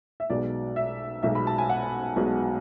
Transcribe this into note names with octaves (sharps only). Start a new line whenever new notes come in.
E5
B1 B2 G#3 D5
E5
B1 B2 G#3 E5
B5
A5
G#5
F#5
B1 B2 G#3